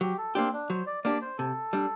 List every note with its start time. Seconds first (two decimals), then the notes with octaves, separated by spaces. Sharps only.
0.01 F#3 G4
0.18 A4
0.35 A#3 C4 D4 G4
0.53 D4
0.69 F#3 C5
0.87 D5
1.04 A#3 D4 G4 D5
1.22 C5
1.38 C3 A4
1.73 G3 D4